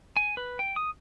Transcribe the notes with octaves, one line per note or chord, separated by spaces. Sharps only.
G#5
B4
G5
D#6